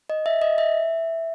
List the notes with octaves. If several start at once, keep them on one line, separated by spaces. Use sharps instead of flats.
D#5
E5
D#5
E5